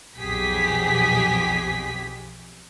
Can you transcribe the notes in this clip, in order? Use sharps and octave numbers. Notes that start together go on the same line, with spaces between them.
B1 F2 G4 G#4 B6